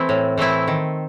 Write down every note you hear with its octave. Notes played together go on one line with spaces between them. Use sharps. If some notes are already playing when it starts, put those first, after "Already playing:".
Already playing: E3 A3 C4 E4
A2
E3 A3 C4 E4
D#3